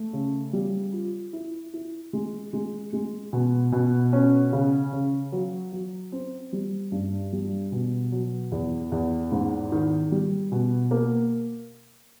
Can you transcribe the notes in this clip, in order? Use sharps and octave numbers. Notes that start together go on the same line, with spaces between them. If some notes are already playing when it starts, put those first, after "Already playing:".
Already playing: A3
C#3
G3
F4
E4
E4
G#3
G#3
G#3
B2
B2
C#4
C#3
C#3
F#3
F#3
C4
G3
G2
G3
B2
F#3
E2
E2
G#2
D#3
G3
B2
A#3